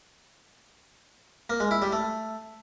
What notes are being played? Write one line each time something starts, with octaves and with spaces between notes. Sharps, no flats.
A#3
G#3
E4
G3
A3